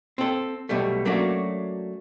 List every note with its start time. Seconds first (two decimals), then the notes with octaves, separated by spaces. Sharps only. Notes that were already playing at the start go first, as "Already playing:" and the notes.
0.18 C4 A4
0.69 B1 B2 G3 A3
1.05 F#3 A3 A#3 C#4 D4 F#4